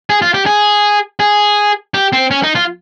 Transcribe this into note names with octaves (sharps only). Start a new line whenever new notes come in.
G#4
F4
G4
G#4
G#4
G4
C4
C#4
D#4
F4